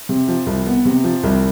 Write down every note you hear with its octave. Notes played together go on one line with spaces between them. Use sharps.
C3
F3
C2
B3
C3
F3
C2